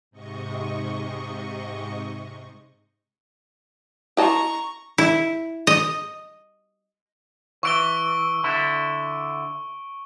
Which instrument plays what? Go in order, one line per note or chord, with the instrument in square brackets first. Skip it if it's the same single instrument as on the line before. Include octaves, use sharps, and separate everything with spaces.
[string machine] G#2 C3 D#5 C#6
[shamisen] E4 D#5 A5 [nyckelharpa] A#5 C#6
[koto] E4
D#5
[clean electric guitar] E3 [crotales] C#6 D7 G7
[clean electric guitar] D3 E4